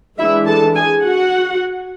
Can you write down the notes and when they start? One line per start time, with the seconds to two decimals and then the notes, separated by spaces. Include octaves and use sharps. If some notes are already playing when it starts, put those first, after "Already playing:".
0.19 E3 G#3 D4 E4 E5
0.47 A4 A5
0.76 G#4 G#5
1.03 F#4 F#5